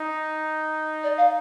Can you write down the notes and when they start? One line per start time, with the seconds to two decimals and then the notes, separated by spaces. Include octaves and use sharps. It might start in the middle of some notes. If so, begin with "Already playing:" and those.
Already playing: D#4
1.03 D5
1.17 F5